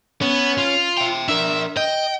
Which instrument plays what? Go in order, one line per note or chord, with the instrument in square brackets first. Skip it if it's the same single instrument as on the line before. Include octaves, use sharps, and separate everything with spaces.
[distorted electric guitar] B3 [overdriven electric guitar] C#4
[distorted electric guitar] F4
[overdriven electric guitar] E5 G5
[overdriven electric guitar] D4 A#4 [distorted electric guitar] E5
[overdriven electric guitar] D#5 [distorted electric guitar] G5